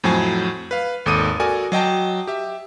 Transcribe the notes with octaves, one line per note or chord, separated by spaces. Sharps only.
F2 A2 F#3 C5 G#5
B4 F5
G#1 D#2 A4 D6 D#6 D#7
F#4 A4 A#4 D5 G#5
F#3 D#5 G5 A5
G4 E5